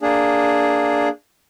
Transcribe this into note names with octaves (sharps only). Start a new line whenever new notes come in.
A#3 D4 G#4